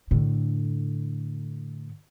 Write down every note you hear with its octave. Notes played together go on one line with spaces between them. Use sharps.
A2 D3